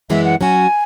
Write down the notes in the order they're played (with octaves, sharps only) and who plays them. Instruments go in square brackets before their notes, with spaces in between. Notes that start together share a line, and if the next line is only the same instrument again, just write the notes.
[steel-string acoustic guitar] F#2 E3 G#3 B3 E4 [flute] E5
[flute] F#5
[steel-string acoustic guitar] F#3 C#4 F#4 [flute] G#5